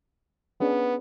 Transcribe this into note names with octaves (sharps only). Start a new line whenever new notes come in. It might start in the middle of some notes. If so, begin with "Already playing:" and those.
B3 C#4 D4 G#4